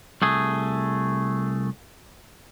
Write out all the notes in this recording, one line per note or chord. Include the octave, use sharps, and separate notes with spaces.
C2 A3 G#4